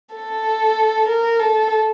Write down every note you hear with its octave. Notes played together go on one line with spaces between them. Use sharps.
A4
A#4
A4